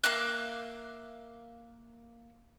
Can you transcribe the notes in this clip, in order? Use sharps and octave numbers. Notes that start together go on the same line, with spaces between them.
A#3 E5 F5 F#6